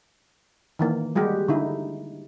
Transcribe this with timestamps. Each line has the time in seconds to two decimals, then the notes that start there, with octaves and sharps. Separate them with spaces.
0.79 D#3 E3 A#3
1.16 G3 G#3 F#4 G4
1.48 D3 D#4 E4